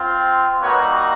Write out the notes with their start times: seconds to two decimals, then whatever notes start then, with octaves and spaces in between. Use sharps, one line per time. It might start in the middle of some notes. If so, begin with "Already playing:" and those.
Already playing: C4 F4
0.61 G3 A#3 D#4 F#4 B4 C#5